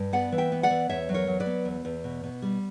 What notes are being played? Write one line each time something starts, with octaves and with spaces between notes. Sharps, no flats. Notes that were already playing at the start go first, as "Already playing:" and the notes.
Already playing: G2
B3 D5 F#5
E3
E5 G5
B3
D5 F#5
E3
E2 C#5 E5
F#3
A#4 C#5
F#3
B4 D5
B3
E2
E2
B2
B2
G3